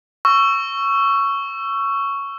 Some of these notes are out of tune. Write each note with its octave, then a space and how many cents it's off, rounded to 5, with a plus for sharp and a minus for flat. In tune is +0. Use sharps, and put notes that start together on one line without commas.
C#6 +5 E6 +25